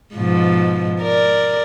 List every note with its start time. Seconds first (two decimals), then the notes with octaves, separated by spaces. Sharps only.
0.15 G#2 B2 F3
1.01 A#4 D5